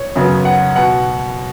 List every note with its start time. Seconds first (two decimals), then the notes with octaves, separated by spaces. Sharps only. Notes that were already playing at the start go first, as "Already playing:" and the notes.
Already playing: C#5
0.16 F#2 C#3 F#3 B3
0.45 F#5
0.76 B2 F#5